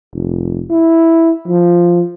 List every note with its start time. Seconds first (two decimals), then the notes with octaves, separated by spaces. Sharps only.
0.13 F1
0.70 E4
1.48 F3